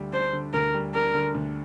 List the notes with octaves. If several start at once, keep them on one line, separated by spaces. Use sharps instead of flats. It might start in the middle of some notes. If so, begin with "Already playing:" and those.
Already playing: D2 D3 G3
D4 C5
D3
D2 A#4
G3
D4 A#4
D3
D2